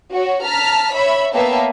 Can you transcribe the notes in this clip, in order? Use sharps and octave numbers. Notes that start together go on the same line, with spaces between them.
F#4 C#5
A5 A#5 F6 B6
C#5 E5 B5
A#3 B3 C#5 E5 G5 A5